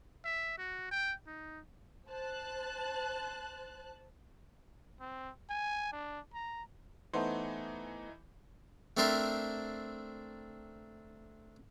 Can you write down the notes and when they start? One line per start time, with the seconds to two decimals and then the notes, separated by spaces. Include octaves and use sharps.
0.25 E5
0.58 F#4
0.91 G5
1.27 D#4
2.07 C5 A5 F#6
5.00 C4
5.50 G#5
5.93 D4
6.34 A#5
7.14 E3 A3 B3 D#4 C5
8.97 A3 C4 D4 A#4 C5 E5